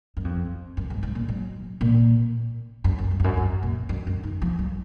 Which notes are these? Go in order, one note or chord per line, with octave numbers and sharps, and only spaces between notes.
F#2
F2
F#2
G#2
G#2
A#2
F#3
A#2
F#2
F#2
F#2
F2
F#2
F#2
A#2
F#2
F#2
D#3
F3
F#3